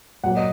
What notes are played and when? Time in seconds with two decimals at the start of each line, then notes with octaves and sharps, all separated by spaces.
0.24 A#2 F#3 A#3 F#5
0.37 D#5